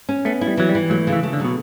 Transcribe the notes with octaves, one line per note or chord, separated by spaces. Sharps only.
C#4
A3 B3
E4
G3
E3 F#3
G3
E3
F#3 A3
C#3
E3
A3
D3
B2 F#3